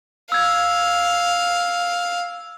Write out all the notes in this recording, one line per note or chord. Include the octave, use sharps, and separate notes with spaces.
F5 E6 G#6